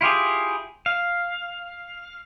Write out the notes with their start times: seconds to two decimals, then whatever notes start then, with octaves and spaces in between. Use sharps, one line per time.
0.01 E4 F4 G4 G#4
0.86 F5